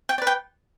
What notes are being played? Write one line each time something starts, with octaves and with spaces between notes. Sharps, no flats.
G5
D5
B4
G5